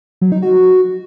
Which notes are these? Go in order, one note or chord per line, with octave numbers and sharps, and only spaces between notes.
F#3
D#4
F#4